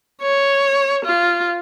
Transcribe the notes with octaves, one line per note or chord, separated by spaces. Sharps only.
C#5
F4